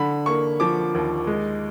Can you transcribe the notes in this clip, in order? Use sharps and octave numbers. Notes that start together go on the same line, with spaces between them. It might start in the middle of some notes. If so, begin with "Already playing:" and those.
Already playing: D3 B5
A#3 C#6
F3 D6
D#2
G#3